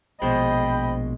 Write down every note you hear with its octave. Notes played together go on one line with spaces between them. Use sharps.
A#1 B2 G#3 C5 D#5 G5 B5